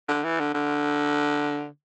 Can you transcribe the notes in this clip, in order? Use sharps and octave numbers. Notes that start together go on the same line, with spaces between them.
D3
E3
D3
D3